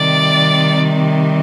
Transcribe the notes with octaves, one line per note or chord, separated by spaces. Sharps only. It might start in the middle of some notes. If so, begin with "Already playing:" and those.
Already playing: C3 D#3 G3 D5